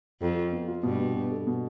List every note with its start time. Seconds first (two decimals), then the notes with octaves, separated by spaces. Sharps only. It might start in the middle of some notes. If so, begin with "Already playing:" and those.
0.21 F2 A4
0.36 F4
0.52 B3
0.68 F4
0.83 G2 B2
0.99 B2
1.15 B2
1.31 A4
1.47 B2